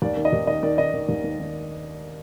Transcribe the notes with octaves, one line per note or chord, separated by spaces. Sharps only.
D#2 D5
D#3
D#5
D#2
D#3 D#5
D#3 D5
D#3 D#5
D#3
D#2
D#3
D#3